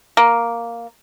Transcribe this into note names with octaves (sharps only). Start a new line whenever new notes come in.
A#3